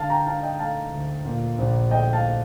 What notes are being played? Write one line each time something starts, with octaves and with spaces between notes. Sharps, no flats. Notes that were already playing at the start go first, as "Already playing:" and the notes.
Already playing: D3 F5 A5
G5 A#5
D#4 F5 A5
D#5 G5
A3 F5 A5
D2
A#2
A#1
A3 D#5 G5
F5 A5